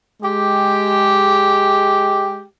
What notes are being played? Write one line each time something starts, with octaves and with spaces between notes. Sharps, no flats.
G#3 G4